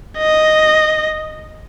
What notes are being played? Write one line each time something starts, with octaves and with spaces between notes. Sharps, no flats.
D#5